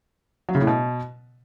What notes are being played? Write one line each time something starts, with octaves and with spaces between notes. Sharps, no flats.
F#3
C#3
A2
B2